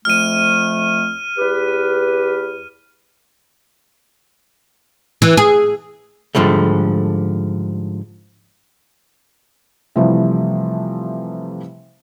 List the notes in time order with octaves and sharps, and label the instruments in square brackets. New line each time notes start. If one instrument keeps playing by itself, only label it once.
[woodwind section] F2 F3 A3 [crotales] F6 D#7
[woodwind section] E2 G4 B4
[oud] E3
G#4
[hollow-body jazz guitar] G#2 D3 F3 G3 A3
[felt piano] C3 E3 F3 G3 A3